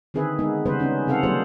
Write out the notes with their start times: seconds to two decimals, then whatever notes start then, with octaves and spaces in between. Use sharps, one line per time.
0.14 D3 D#3 C4 G#4 B4 E5
0.39 G#3 B3 D#4
0.65 C#3 G3 B3 B4 C5
0.80 C4 C#4 D#4
1.07 C3 C4 A4 F5 F#5
1.23 F#3 G3 A#3 F4 G#4 C5